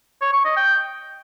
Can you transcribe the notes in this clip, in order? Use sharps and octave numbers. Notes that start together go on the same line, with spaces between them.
C#5
C#6
D#5
G5